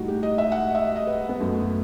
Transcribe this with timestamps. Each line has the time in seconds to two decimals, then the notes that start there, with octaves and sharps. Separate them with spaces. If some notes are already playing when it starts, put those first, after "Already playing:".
Already playing: A2 G3 D#4 F#4
0.08 G4
0.23 D#5
0.38 E5
0.52 F#5
0.75 E5
0.96 D#5
1.07 B4
1.29 B3
1.40 F#2 F#3 A3